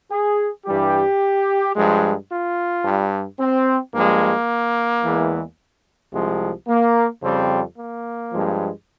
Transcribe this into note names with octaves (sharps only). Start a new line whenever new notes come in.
G#4
G2 E3 G3 G4
G2 F3 G#3
F4
G2 G3
C4
G2 F3 G#3 A#3
E2 E3 G#3
C2 C3 F3 G#3
A#3
F2 C#3 G3 C4
A#3
G2 F3 G#3